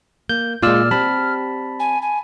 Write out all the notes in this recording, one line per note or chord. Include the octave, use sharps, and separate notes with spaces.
A#3 G6
A#2 G#3 F4 D5 E6 F6
G3 C4 G4 A5 B5
G#5
G#5